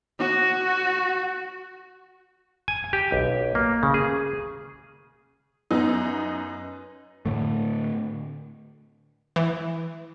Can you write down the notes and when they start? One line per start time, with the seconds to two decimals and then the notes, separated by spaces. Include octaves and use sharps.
0.19 F#4
2.68 G#5
2.93 G4
3.12 B1
3.55 A#3
3.83 C#3
3.94 G#4
5.71 F#2 B3 D#4
7.26 A2 D3 A3
9.36 E3